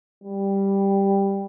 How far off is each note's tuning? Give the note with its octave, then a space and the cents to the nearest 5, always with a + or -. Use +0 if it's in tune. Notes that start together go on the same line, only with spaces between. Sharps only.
G3 +5